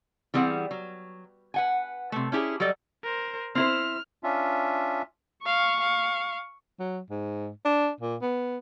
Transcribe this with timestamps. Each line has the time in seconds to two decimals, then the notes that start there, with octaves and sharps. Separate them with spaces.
0.34 E3 G3 C4 G#4 F#5
0.71 F#3
1.54 B4 F#5 G#5
2.12 C3 A3
2.32 C#4 E4 G4 G#4
2.60 F#3 G3 A4 D5 D#5
3.03 A#4 C5
3.55 C4 E4 C5 F6
4.24 C#4 D4 F4 E5
5.45 F5 C#6
5.80 F5
6.80 F#3
7.10 G#2
7.65 D4
8.01 A#2
8.22 B3